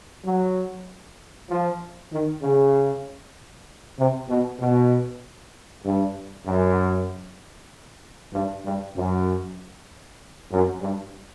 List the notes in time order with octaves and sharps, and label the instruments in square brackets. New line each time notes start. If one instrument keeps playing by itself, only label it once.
[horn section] F#3
F3
D#3
C#3
C3
B2
B2
G2
F#2
G2
G2
F#2
F#2
G2